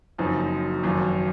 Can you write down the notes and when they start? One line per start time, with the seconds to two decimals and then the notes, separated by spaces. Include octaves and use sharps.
0.18 F#1 F#2 F3 C4 D#4
0.83 G#1 F#2 F3